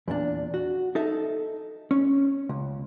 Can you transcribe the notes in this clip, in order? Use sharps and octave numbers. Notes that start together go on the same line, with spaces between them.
E2 A#2 D4
F#4
D#4 A4 E5
C#4
C#2